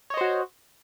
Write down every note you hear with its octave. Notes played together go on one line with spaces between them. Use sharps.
F#4 C5 C#5 D#5